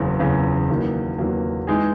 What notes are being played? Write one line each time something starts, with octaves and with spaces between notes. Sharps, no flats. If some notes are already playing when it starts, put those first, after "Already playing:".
Already playing: F#1 E2 C#3
F#1 E2 C#3
E2 D#3 F#3 A#3
E2 D#3 F#3 A#3
E3 G#3 D#4 G#4